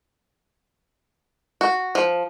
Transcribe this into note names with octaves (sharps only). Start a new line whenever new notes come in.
F#4
F3